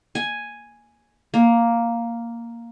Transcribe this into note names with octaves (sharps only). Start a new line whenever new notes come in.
G#5
A#3